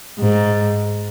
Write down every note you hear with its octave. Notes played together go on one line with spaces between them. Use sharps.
G#2